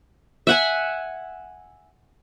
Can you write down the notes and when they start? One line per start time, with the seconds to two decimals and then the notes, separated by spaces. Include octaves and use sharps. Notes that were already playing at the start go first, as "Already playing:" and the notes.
0.47 E5 F#5 G#5